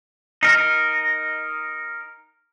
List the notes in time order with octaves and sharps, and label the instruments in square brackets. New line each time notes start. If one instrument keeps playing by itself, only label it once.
[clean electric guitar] D#4 A#4